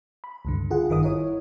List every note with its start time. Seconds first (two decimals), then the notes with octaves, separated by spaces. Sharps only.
0.24 B5
0.45 C#2 G2 D3
0.70 F4 G#4 F#5
0.89 G#1 G2 D#3 A#4 D#5 D#6
1.03 E4 A#4 C#5